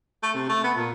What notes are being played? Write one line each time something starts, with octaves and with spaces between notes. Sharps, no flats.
A3
C3
A3
B3
A#2